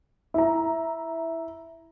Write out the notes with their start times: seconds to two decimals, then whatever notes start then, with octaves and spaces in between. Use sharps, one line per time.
0.34 E4 A#5